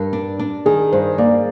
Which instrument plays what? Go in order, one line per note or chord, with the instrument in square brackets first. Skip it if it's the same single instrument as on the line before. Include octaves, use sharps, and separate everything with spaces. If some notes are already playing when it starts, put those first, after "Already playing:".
Already playing: [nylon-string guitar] G2 [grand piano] A#4
[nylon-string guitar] D4
D4
[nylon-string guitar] D#3 [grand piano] G#4
[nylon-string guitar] G2 [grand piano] C5
[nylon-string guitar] A#3 [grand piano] D5